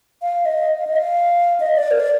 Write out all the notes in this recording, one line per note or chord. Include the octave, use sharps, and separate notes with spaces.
F5
D#5
F5
D#5
F5
D#5
D5
A#4
D5